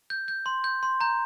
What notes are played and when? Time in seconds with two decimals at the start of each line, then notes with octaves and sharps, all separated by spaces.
0.10 G6
0.28 G6
0.46 C6
0.64 G6
0.83 C6
1.01 A#5 G6